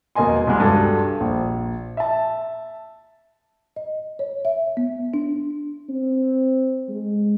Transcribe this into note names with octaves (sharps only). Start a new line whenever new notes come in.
E1 B2 A#3 D#5 G#5 C6
C2 G#3
G2 F#4 A4
A#1
E5 A5
D#5
C#5
E5
B3
D4
C4
G#3